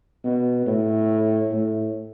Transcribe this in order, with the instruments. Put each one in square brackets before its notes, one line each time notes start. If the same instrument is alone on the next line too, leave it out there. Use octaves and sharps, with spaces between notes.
[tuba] B2
A2
A2